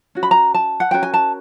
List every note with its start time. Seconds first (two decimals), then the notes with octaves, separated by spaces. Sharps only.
0.15 C#4 F#4
0.23 B5
0.31 A#5
0.54 A5
0.80 F#5
0.91 C#4 F#4 A#4 G5
1.03 G#5
1.14 A5